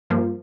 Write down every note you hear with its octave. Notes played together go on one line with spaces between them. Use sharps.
G2 F3 A#3